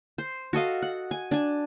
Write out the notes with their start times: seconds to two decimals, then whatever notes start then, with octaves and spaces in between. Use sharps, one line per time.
0.18 C5
0.53 F#4 A4 D#5 F5
0.82 F#5
1.11 G#5
1.31 D4 G#5